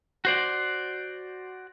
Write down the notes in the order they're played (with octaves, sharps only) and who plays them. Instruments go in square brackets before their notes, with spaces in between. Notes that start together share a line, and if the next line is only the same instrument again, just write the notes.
[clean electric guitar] F#4 C5 D5